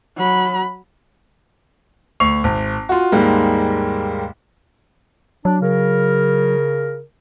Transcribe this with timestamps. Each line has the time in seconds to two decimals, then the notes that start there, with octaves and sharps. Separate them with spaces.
0.17 F#3 B5
2.20 D2 C#6 C7 F7
2.44 G#1
2.89 F4 F#4
3.12 D#2 G#2 G3 G#3 A#3
5.45 F#3 D4
5.62 C#3 A#4